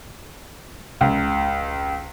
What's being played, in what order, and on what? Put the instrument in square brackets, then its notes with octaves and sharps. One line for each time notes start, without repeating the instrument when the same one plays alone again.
[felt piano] C#2